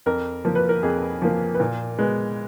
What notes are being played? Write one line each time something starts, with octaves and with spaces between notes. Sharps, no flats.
F2 A#4
F3 A#3
B4
A#4
F2 G#4
F3 A#3
B4
A#2 A#4
G#3 B3